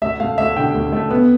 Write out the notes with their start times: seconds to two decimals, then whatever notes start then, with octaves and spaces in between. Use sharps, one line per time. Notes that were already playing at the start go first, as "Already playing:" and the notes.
0.02 D2 E5
0.20 A3 F5
0.38 D2 E5
0.56 D3 G5
0.74 D2
0.93 A3
1.11 B3